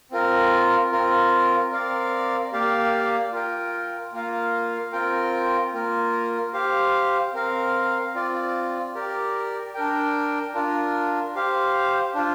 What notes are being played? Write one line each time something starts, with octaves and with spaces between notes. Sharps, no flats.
C4 F4 A#4
C4 F4 A#4
C4 A#4 D5 F5
A#3 G4 D5 F5
F4 A#4 G5
A#3 F4 A#4 F5
C4 F4 A#4 G5
A#3 F4 A#4
G4 C5 F5
C4 A#4 F5
C4 F4 D5
G4 A#4 D5
D4 A#4 G5
D4 F4 A#4
G4 C5 F5
D4 F4 C5